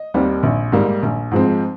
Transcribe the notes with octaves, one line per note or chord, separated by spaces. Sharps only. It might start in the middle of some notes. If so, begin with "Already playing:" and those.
Already playing: D#5
D#2 D#3 G3 C4
A#1
G#2 G3 A#3
A#1
G#2 F3 G#3 C4